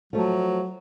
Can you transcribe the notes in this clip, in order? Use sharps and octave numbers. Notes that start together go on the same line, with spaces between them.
F3 F#3 A3